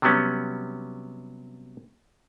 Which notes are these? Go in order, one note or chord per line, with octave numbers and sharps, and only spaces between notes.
C3 F#3 G3 B3 C#4